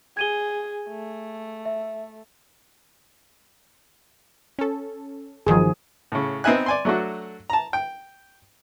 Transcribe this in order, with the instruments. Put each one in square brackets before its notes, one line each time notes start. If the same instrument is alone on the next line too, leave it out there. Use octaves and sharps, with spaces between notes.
[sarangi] G#4 [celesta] G#6 D#7 G7
[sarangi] A3
[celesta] E5
[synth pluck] C#4 A4
[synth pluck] G1 D#3 F#3 [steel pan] F3 G#4
[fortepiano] A2 C#3
B3 C4 D#4 E5 G#5 F#6
D5 G#5 C6
F#3 A3 D4 F#4
A5 A#5
G5